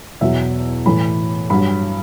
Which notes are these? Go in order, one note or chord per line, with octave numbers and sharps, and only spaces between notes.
E2 B2 F#3 E5
A2 E3 B5
G2 F#3 B5